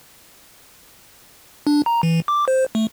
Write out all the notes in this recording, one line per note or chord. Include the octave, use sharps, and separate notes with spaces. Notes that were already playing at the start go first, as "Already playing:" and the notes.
D4
A#5
E3
D6
C5
A3